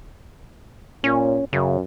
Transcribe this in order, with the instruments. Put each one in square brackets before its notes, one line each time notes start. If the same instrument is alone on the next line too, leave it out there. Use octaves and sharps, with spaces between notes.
[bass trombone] A#2 [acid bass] C#4
[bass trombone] F#2 [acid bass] C#3